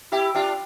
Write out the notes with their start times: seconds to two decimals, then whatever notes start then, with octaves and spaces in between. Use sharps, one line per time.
0.12 E4 G4 E5 G5
0.35 D4 F4 E5 G5